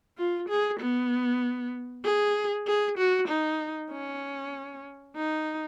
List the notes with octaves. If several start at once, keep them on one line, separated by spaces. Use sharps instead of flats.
F4
G#4
B3
G#4
G#4
F#4
D#4
C#4
D#4